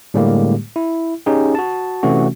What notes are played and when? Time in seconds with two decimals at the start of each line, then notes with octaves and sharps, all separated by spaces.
0.14 A2 D3 G3 G#3 A#3 G4
0.76 E4
1.26 C#4 D#4 G4 G#4
1.55 F#4 A5
2.03 C3 E3 A3 C#4 F#4